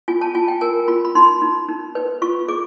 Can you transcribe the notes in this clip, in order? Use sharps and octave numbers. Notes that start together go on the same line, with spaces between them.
F4 G#5
A5
F4 G#5
G5
A#4 G#5
F4 B5
B5
D#4 C6
D#4
D#4
B4
F4 C#6
G#4 D6